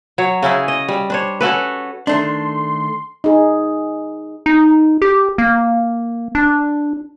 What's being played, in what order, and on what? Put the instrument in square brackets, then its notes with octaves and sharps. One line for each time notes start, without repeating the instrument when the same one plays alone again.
[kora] F#3 C#5
C#3 C#4 E4 G#4
D#5
G3
D4 C5 C#5
C#4 F#4 A4 B4
[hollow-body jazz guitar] D#3 A3 D4 [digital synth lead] C6
[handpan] D#4 G#4
[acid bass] D#4
G4
A#3
D4